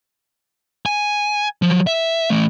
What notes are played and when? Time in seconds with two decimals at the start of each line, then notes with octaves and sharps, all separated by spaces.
0.86 G#5
1.62 F3 F#3
1.87 E5
2.30 E3 A3